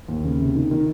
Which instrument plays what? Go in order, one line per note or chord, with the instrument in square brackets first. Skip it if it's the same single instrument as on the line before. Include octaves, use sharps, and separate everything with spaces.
[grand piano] D#2
C#3
C3
D#3
D#3